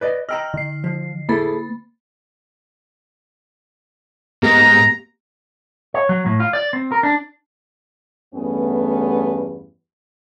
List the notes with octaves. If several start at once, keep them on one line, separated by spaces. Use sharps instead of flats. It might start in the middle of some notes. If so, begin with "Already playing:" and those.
B4 D5 D#5
D#5 G5 A#5 E6 F6
D3 C7
F3
A#3 E4 G#4 A4 B5 A6
G#2 A#3 B3 G4 A#5
C#5
F#3
A2
F4
D5
C4
A#4
D4
E2 G2 A3 B3 C#4